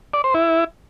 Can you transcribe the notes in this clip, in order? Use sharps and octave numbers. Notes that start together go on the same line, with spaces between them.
D5
C5
E4